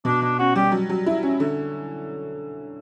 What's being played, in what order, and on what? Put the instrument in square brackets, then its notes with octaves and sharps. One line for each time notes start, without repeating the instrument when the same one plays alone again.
[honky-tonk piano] B2 [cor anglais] D4
[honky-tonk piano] B2 [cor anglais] D4
[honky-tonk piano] C#4 [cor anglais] F#4
[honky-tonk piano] G3 [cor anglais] G4
[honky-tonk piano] F#3
F#3
E4
C#4
D3